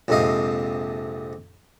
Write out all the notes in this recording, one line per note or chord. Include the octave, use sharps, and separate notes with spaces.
A#1 F2 G#2 C3 D#5 F5